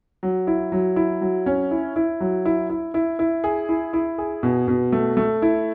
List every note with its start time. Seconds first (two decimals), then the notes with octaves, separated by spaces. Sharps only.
0.23 F#3
0.47 E4
0.72 F#3
0.96 E4
1.21 F#3
1.46 C#4
1.71 E4
1.96 E4
2.20 F#3
2.45 E4
2.70 E4
2.94 E4
3.19 E4
3.44 G#4
3.69 E4
3.93 E4
4.18 G#4
4.43 B2
4.68 B2
4.92 A3
5.17 A3
5.42 E4